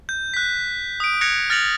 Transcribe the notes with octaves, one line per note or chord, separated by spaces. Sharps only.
G6
F#6 B6
D#6 D7
F#6 G#6 A#6 C#7 F7
F6 A6 A#6 C#7 F7 F#7